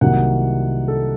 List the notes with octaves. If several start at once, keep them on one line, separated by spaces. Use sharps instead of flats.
C2 C3 D#3 F#3 A#3 F#5
A4